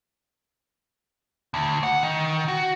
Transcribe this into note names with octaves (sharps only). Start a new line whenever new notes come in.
D2
F#5
D#3
F#4